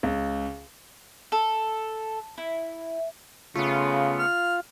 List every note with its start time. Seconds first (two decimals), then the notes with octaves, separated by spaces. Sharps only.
0.03 C#2
1.32 A4
2.38 E4
3.56 C#3 A3 B3 F4
4.19 F6